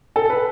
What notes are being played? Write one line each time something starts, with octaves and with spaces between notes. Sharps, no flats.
A4
B4